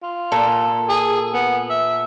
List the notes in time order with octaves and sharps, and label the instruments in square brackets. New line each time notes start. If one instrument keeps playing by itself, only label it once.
[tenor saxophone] F4
[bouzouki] A#2 A4
[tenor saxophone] G#4
B3
E5